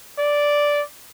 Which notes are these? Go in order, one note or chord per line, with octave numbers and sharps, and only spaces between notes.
D5